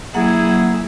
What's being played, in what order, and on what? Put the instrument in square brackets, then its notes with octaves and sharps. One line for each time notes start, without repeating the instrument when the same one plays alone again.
[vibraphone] F#3 A#3 F#5 [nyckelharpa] E4 G#4